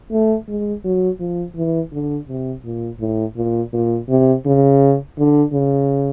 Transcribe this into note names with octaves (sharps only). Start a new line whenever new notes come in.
A3
G#3
F#3
F3
E3
D3
C3
A#2
A2
A#2
A#2
C3
C#3
D3
C#3